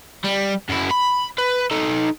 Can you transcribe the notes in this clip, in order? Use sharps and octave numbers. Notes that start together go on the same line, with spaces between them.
G3
F#2 E4
B5
B4
D#4 A4